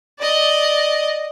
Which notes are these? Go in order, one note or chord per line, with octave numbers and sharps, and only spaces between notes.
D5 D#5